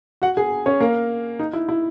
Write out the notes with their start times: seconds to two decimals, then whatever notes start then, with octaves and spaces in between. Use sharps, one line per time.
0.22 F#4 F#5
0.37 G#4 G#5
0.66 C#4 C#5
0.80 A#3 A#4
1.39 D#4
1.53 E4
1.69 E4